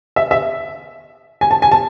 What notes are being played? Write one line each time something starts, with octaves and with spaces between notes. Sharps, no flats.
E5
E5
G#5
A5
G#5
A5